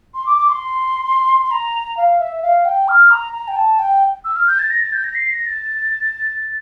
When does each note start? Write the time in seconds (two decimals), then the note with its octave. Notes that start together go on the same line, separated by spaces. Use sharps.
0.14 C6
0.26 D6
0.37 D6
0.49 C6
1.45 C6
1.51 A#5
1.97 F5
2.20 E5
2.42 F5
2.65 G5
2.88 F6
3.10 A#5
3.33 A#5
3.48 G5
3.56 A5
3.79 G5
4.25 E6
4.36 F6
4.47 G6
4.59 A6
4.70 A#6
4.81 A6
4.93 G6
5.04 A#6
5.15 C7
5.30 A#6
5.46 A6